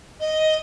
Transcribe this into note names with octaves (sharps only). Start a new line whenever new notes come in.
D#5